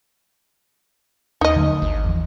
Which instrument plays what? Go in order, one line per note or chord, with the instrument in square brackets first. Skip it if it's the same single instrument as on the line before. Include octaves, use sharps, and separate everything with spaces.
[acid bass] D#2 [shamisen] D#4 D#5
[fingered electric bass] D3 F#3 A3
[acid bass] G#1 [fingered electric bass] D2
[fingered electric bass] E2 F3